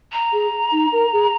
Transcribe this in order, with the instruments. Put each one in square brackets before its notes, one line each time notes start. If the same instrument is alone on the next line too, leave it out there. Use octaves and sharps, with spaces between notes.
[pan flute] A#5
[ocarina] G#4
D#4
A#4
G#4